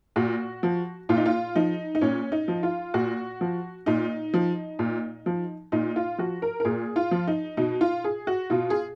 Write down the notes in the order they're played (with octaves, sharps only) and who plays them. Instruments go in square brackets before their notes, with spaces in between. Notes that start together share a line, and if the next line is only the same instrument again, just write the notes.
[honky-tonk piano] A#2 F#4
F3
A#2 F4
D#4
F4
F3 D#4
D#4
A#2 C#4
D#4
F3
F4
A#2 F#4
F3
A#2 D#4
F3
A#2
F3
A#2 D#4
F4
F3 F#4
A#4
A#4
A#2 G#4
F4
F3
D#4
B2 D#4
F4
G#4
F#4
B2 F4
G#4